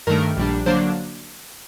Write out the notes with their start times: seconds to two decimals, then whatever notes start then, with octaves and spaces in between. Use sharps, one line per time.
0.07 G2 D#3 A3 A#4
0.37 A#1 A#2 G3 D4
0.66 D3 F#3 A#3 D4 C5